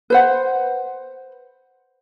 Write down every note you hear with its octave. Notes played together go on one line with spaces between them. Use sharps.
B4 C5 F#5